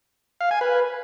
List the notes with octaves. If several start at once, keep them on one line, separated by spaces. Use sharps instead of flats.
F5
G#5
B4